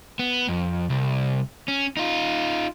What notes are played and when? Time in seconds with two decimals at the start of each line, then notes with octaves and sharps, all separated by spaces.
0.19 B3
0.48 F2
0.90 C2
1.68 C#4
1.97 D#4 F4